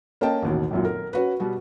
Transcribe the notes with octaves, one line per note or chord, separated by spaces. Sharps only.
A#3 C#4 D#5 G5 A5
A1 D#2 B2
G#1 F#2 A#2
A#4
C#4 F#4 B4
B2 G3 F#4